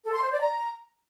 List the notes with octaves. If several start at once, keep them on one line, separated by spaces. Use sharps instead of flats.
A4
C6
C5
D5
A#5